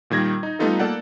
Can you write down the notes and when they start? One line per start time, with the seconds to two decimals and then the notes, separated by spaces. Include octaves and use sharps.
0.10 A#2 D#3 G3 G#6 A#6
0.43 D#4
0.59 G3 A3 B3 D#4 F4 A4
0.79 A3 A#3 A4 D5 F#5